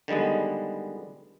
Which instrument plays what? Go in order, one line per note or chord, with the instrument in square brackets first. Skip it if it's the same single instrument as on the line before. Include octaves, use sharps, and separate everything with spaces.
[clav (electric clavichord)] D3 D#3 G3 G#3 B3